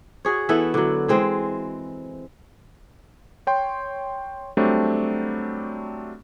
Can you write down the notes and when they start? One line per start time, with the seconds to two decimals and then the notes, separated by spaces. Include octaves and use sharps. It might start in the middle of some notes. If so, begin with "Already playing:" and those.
0.25 F#4 G#4 C#5
0.49 E3 B3 E4 A4
0.74 D3 F#3
1.08 E3 G#3 C4
3.47 C#5 G5 C6
4.57 F#3 G3 A3 C4 D4